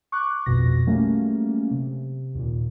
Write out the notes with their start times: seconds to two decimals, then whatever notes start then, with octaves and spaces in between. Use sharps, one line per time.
0.12 C#6 D6 F#6
0.46 A#1 F2 B2 A#6
0.87 F#3 G3 A3 A#3 C#4
1.71 C3
2.35 D#2 A#2